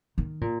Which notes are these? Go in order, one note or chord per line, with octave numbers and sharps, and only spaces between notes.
D#3
A#2